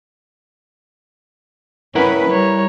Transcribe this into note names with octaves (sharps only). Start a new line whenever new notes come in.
C#4 E4 A#4 B4 F#5
G3 C#5 A#5